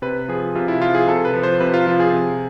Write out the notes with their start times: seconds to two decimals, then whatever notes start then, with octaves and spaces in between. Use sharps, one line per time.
0.02 C3 B4
0.28 F3 G#4
0.55 C3 F4
0.68 E4
0.81 F3 F4
0.94 G#4
1.07 C3 A4
1.25 B4
1.34 F3
1.43 C5
1.60 C3 B4
1.74 F4
1.87 F3 F4
2.00 G#4
2.13 C3